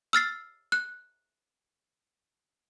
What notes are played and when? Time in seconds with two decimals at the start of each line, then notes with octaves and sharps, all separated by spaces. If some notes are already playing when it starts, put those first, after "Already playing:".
0.13 E6 F6 A6 C7
0.72 F#6